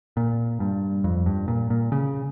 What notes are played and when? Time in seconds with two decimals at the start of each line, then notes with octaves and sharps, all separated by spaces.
0.17 A#2
0.60 G2
1.04 F2
1.26 G2
1.48 A#2
1.70 A#2
1.92 C#3